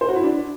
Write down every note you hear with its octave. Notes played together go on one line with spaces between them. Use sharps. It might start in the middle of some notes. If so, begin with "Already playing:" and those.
C5
F#4
E4
D4